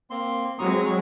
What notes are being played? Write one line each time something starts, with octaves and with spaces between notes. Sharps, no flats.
A#3 C4 C6
F#3 G#3 C4 A#5 C#6 D#6